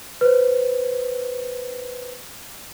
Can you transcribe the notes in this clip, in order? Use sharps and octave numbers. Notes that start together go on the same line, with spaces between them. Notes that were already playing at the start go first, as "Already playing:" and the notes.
B4 C5